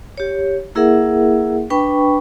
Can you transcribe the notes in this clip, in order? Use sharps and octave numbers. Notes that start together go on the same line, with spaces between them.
G4 C#5
A#3 E4 G#4 A#4 E5 F#5
D4 B4 G5 B5 C#6